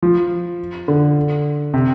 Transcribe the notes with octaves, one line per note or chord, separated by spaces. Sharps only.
F3
D3
C3